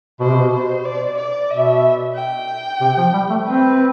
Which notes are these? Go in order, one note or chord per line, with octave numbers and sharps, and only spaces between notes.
B2 C5
C3
B2
C5
D5
D5
B2 E5
G5
C3
F3
G3
A3
C4 B4